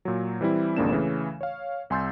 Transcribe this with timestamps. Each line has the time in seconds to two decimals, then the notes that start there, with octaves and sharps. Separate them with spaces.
0.05 A#2 F#3
0.41 E3 G3 C4 E4
0.77 G#1 F2 C#3 A#3 D4 E7
0.90 C#3 E3 A3 C#4
1.41 C#5 F5
1.90 C2 G#5 C6 E6 G6 A6